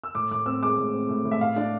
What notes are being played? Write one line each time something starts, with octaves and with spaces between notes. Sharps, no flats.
E6
A2 D6
A2 D6
C4 E6
G#3 D6
A2
C4
A2
A2
E5
A2 F5
D4 D5